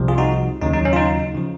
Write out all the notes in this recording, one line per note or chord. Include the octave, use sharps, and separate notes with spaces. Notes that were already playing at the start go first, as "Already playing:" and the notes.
Already playing: C2 C3 F3
F4 G#4
D#4 F#4
D#2 C#3 F#3 D#4
D#4
C#4
F4
D#4
C#3 F3